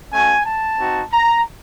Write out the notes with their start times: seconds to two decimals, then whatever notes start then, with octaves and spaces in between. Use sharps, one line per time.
0.12 A3 C#4 F#4 G#5
0.45 A5
0.78 C4 D#4 F#4
1.12 A#5